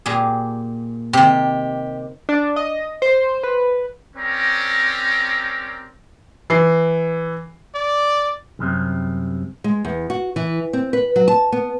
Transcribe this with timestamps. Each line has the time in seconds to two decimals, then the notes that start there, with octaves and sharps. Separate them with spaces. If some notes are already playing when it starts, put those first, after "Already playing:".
0.06 A#2 G4 G#4
1.13 C3 D#3 G4
2.29 D4
2.56 D#5
3.02 C5
3.43 B4
4.16 C4 C#4 G4 A#4 D5 A#5
6.50 E3 C7
7.75 D5
8.59 C2 F#2 C3
9.64 G#3
9.85 E2
10.10 F#4
10.36 E3
10.73 C4
10.93 B4
11.16 F#3
11.28 A5
11.52 B3